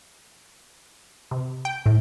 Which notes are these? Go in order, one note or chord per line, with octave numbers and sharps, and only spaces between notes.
C3
G5
A2